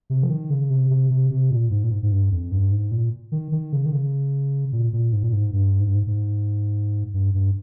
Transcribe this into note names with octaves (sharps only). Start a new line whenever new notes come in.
C3
F3
D#3
C#3
C3
C3
C3
C3
A#2
G#2
A#2
G#2
G#2
G2
F2
G2
G#2
A#2
D#3
D#3
C#3
D#3
C#3
A#2
A#2
G#2
A#2
G#2
G2
G#2
G2
G#2
G#2
G2
G2